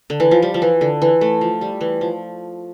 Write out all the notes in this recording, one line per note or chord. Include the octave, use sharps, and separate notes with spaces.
D3
E3
F3
G3
F3
E3
D3
E3
A3
F3
G3
E3
F3